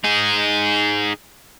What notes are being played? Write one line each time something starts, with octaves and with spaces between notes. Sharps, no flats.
D#4 G#4